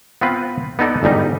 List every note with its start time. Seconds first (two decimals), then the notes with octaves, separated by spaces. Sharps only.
0.21 B3 C4 F4 B4
0.79 B3 D#4 A4 D5
1.03 G1 G#2 G3 D#4